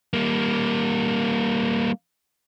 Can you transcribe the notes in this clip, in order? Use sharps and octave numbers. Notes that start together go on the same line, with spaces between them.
G3 A#3